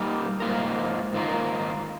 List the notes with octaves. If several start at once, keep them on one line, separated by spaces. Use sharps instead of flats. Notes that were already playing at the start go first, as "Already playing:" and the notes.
Already playing: G3 A#3 D#4 A#4
G#2 D#3 A#3 F4 A#4
G#2 D#3 A#3 F4 A#4